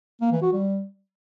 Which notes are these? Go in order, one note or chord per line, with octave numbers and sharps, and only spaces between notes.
A#3
E3
F#4
G3